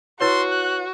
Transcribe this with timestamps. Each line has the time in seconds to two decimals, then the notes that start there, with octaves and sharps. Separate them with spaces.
0.21 E4 F#4 B4 C#5 C6
0.52 F#6